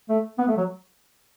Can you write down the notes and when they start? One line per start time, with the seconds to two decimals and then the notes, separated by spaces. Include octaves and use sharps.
0.09 A3
0.39 B3
0.48 A3
0.57 F#3